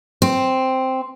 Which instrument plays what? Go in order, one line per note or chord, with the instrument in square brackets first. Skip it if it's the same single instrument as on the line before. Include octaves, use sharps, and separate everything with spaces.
[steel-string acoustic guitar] C4